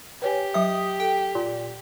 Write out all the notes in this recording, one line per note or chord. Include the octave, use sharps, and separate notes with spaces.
G4 B4 C#5 G#5
F#3 E5 D#6
A4 G5
A#2